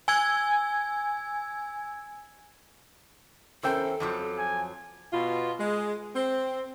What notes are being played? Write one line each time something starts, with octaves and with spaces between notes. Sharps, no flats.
G#5 E6 G#6
E2 C#4 A4 A#4 C5 G5 E6
F2 F3 F#3 A5 D6 G6
G#5
B2 F4
G#3
C4